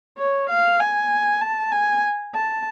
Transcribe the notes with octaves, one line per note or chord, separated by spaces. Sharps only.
C#5
F5
G#5
A5
G#5
A5